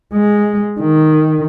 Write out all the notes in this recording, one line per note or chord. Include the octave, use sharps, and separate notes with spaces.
G#3
D#3